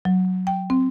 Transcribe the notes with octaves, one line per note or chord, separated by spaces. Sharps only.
F#3
G5
C4